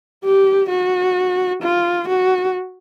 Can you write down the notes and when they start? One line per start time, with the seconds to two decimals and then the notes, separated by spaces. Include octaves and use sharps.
0.24 G4
0.69 F#4
1.62 F4
2.08 F#4